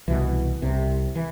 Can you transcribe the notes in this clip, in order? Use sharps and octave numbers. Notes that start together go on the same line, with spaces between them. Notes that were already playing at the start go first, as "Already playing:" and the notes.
C2 B2 E3
C2 C3
E3